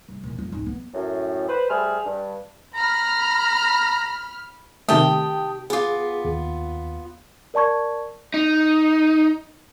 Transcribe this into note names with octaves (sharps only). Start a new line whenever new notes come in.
C2
E2 A#2
F2 F4
C#2 G#2
B3
F#2 A2
B4 C5
G3 A3 G#4 C5 F6
G2
A#5 B5 F6
C3 D#3 A3 G4 G5 A5 D#6
B3 F4 G#4 D6
D#2
A#4 D5 A5 C#6 G#6
D#4